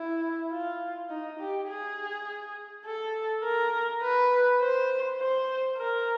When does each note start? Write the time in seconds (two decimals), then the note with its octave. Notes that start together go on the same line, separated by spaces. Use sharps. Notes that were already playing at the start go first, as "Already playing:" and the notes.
Already playing: E4
0.51 F4
1.10 D#4
1.39 G4
1.69 G#4
2.85 A4
3.44 A#4
4.02 B4
4.61 C5
5.19 C5
5.78 A#4